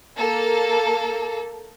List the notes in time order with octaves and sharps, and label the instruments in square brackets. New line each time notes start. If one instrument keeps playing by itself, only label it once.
[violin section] A#3 A4